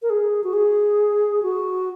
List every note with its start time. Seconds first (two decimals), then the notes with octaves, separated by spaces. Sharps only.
0.02 A#4
0.10 G#4
0.44 F#4
0.53 G#4
1.43 F#4